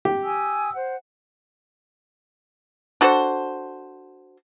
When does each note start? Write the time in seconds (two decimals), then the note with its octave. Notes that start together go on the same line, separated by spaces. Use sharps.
0.05 G4
0.24 G#5 D#6 E6
0.74 C5 F#5
3.01 D4 F#4 A4 C5